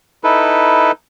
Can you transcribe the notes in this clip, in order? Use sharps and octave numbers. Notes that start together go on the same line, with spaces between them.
D#4 E4 A4 B4